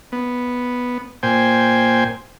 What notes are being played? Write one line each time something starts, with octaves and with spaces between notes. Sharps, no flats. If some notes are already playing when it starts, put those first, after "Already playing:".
B3
A#2 C5 G5 G#5